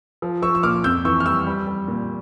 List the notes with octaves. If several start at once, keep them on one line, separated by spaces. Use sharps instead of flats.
F3
F3 C#6 E6
E6
A#2 D6 F6
F2 E6 G6
E3 C#6 E6
F6
G3 C#6 E6
G3
G3
A#2